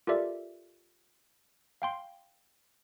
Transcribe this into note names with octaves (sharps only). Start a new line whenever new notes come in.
F4 G4 A4 A#4 D5 E5
F5 G5 C6